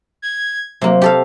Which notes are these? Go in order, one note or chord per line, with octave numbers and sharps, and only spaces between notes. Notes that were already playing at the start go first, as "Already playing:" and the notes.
G#6
C3 F#3 A#3
G4 A4 F5